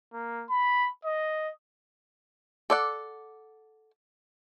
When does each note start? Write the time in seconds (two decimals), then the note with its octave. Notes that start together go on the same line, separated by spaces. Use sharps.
0.13 A#3
0.49 B5
1.05 D#5
2.70 A4 D5 F#5